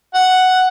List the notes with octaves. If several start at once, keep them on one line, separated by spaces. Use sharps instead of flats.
F#5